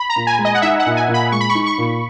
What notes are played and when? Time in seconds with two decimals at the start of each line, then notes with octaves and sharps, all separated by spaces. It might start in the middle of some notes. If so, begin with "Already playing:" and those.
Already playing: B5
0.10 A#5
0.16 A#2
0.27 G#5
0.38 G#3
0.45 D#5
0.54 F#5
0.62 D#4 E5
0.80 F#5
0.86 A#2
0.97 G#5
1.08 A#2
1.14 B5
1.32 G#3 C#6
1.41 B5
1.50 C#6
1.55 D#4
1.66 C#6
1.78 A#2